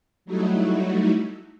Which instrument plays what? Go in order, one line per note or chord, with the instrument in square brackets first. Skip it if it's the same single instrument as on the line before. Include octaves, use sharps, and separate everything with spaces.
[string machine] F#3 G3 A3 D#4 E4 F#4